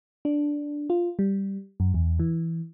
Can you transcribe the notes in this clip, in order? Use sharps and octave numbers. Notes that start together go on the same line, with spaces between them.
D4
F4
G3
F#2
E2
E3